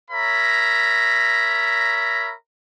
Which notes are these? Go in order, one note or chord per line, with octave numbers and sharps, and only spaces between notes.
A#4 C#5 E5 A#5 B5